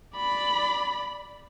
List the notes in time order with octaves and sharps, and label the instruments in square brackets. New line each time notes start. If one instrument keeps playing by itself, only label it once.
[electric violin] D5 B5